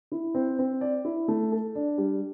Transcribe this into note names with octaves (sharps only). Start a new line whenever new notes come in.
E4
C4
C4
D5
E4
A3
A4
D4
G3